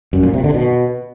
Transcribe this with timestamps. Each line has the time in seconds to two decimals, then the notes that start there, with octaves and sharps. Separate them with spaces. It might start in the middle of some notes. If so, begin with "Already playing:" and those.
0.13 F#2
0.23 A#2
0.34 C3
0.44 D3
0.54 B2